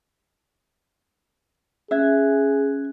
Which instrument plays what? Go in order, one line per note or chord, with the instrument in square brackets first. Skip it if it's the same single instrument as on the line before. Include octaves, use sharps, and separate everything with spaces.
[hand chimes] C#4 F#6 G#6 [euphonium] G#4 [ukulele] E5